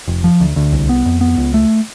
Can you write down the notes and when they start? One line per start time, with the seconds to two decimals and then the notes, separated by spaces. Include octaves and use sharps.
0.07 F1
0.24 F3
0.40 D2
0.56 D2
0.72 C2
0.89 B3
1.06 F2
1.21 B3
1.38 C#2
1.54 A3